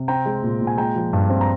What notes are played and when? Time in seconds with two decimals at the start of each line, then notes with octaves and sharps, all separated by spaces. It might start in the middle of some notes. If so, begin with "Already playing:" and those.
Already playing: C3
0.08 C4 G5 A#5
0.26 G#3
0.43 A#2
0.61 A#2
0.67 G#5
0.77 G#3 G5 A#5
0.95 F3
1.13 G2
1.30 C4
1.41 A#5